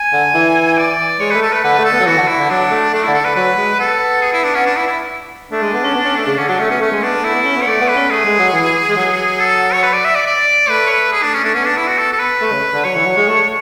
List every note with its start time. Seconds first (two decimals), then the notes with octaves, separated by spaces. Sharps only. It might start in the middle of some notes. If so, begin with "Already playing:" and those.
Already playing: G#5
0.13 D3
0.34 E3
0.78 D5
1.20 G#3 C#5
1.31 A3 B4
1.42 A4
1.50 A3 B4
1.64 D3 B4
1.78 A3
1.85 A4
1.92 B3
2.00 F#3
2.06 E3 F#4
2.17 D3
2.28 E4
2.39 D3
2.50 F#3 D4
2.71 A3
2.93 A3 D4
3.03 D3 E4
3.14 A4
3.25 B4
3.35 F#3 B4
3.57 G#3
3.79 B3 A4
4.22 G#4
4.33 E4
4.44 D4
4.55 C#4
4.66 D4
4.76 E4
4.87 E4
5.51 A3 D4
5.62 G#3
5.73 B3
5.84 C#4
5.95 B3
6.05 C#4
6.16 A3
6.27 C#3
6.37 D3 C#4
6.48 F#3 D4
6.59 A3 C#4
6.70 B3 C#4
6.81 A3 C#4
6.92 G#3
7.02 B3 D4
7.13 B3
7.24 A3 E4
7.35 B3
7.45 C#4
7.56 B3
7.62 C#5
7.67 A3 D5
7.81 B3
7.88 B4
7.96 C#4
8.10 A3 G#4
8.25 G#3
8.39 F#3
8.53 E3
8.89 G#3
8.96 F#3
9.40 A4
9.73 C#5
9.83 B4
9.93 D5
10.05 E5
10.15 D5
10.26 D5
10.69 A3 B4
10.87 C#5
10.90 B4
11.12 G#4
11.23 D4
11.34 C#4
11.44 A3 D4
11.55 B3 C#4
11.65 D4
11.77 E4
11.88 F#4
11.98 A4
12.13 A4
12.19 B4
12.42 A3
12.52 C#3
12.73 D3
12.84 F#3 C#5
12.95 E3
13.06 F#3
13.17 G#3
13.28 A3